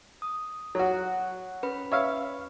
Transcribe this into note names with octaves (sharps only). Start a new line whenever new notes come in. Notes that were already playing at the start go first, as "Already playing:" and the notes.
D#6
F#3 F#4
C#4 B4 B5
C#5 E5 F5